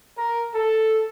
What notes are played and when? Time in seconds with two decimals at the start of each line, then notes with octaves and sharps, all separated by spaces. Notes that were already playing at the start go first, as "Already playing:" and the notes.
0.18 A#4
0.55 A4